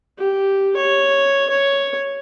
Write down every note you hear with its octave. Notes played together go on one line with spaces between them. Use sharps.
G4
C#5
C#5